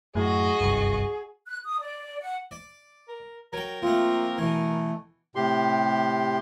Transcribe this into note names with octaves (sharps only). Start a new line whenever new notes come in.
F#2 A2 F#4 G#4 D#5
F#1 C2 G2
F#6
D#6
D5
F#5
D5
A#4
F#3 A#4 G5
F3 A3 A#3 C4 F4
B2 E3 A3
A2 C3 G4 C6